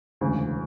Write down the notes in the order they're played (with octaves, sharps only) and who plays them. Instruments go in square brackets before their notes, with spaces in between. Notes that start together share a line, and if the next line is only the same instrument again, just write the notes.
[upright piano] E1 D2 C#3